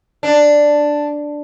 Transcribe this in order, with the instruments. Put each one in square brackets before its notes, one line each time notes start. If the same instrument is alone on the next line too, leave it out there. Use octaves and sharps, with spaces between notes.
[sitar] D4